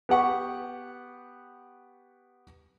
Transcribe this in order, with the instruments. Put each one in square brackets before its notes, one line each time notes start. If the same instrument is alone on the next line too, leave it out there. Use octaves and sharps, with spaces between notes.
[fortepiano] B3 G4 F#5 C#6